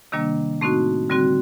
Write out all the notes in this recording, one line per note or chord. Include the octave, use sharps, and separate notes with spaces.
C3 D#3 G3 A#3 D4
A2 A3 C4 D#4 F#4
D3 G3 C4 F#4